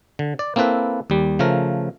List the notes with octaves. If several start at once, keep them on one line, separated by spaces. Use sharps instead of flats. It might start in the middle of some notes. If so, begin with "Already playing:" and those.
D3
D5
A#3 C4 E4 A4 B4
D#2 G3
C#3 F3 A3 A#4